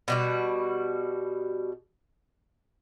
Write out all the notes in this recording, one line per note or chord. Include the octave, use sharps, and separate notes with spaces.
B2 G3 F#4